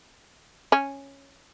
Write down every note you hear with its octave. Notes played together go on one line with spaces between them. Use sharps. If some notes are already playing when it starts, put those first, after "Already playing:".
C#4